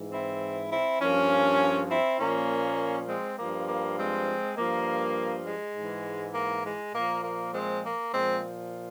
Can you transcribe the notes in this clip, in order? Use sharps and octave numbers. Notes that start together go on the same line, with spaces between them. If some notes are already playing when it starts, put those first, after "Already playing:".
Already playing: G#2 E3
C4 E4
C4 E4
G2 F3 A#3 C#4
C4 E4
A#2 F3 A#3 C#4
G#3 C4
G2 F3 A#3
A#3
G#3 C4
G2 F3 A#3
G#3
G#2 E3
A#3
G#3
A#2 F3 A#3
A#3
G#3 C4
A#3
A#2 F3 G#3 C4